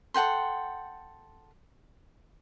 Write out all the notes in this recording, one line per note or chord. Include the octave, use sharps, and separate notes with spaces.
A4 F#5 G5 C6